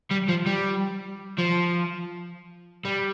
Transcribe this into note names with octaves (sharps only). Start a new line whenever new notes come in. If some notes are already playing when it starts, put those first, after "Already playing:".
G3
F3
G3
F3
G3